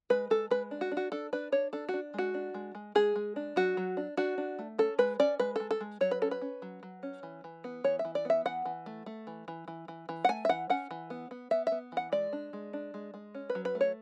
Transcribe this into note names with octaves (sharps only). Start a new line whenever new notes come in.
G#3 B4
G#3 A4
G#3 B4
D4
F#4
D4
F#4
D4 A4
D4 B4
D4 C#5
D4 A4
D4 F#4
G#3 F#4
D4
G#3
G#3
G#3 G#4
G#3
D4
F#3 F#4
F#3
D4
D4 F#4
D4
A3
C#4 A4
G#3 B4
C#4 D5
G#3 B4
G#3 A4
A4
G#3
F#3 C#5
B4
C#4 A4
B4
C#4
F#3
F#3
C#4
E3
E3
B3
E3 C#5
E5
E3
D5
B3 E5
E3 F#5
E3
A3
A3
E3
E3
E3
E3
E3
F#5
A3 G#5
E5
E3 F#5
C#4 F#5
E3
B3
B3
B3 E5
B3 E5
E3 F#5
G#3 D5
D4
G#3
D4
G#3
G#3
C#4
B4
F#3
B4
A3
C#5